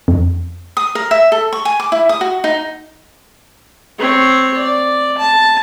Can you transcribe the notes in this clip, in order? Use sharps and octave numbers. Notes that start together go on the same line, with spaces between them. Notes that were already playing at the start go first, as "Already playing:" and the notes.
F2
D#6
A#4
E5
A4
C#6
G#5
D6
E4
D#6
F#4
D#4
C4 C#5
D5
A5